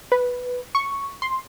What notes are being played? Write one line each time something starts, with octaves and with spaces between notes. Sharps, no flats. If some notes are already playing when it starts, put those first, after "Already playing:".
B4
C#6
C6